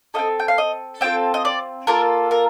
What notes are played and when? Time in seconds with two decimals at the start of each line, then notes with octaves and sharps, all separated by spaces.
0.14 F4 A4 D#5
0.19 C4
0.40 G5
0.48 F5
0.58 D#5
1.01 C4 F4 A4 G5
1.34 D#5
1.45 D5
1.87 A#3 F4 A4 A#4
2.31 A#4